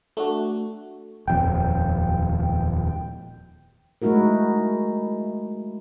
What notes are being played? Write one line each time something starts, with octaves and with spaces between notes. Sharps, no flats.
A3 D4 F#4
D#1 F2 G5
G#3 A3 D#4 E4 F#4 A#4